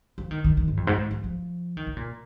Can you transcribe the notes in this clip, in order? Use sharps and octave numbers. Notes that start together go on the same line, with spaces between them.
F3
D#3
D#3
D#3
G#2
F2
G#2
G#2
F3
F3
D#3
C#3
A#2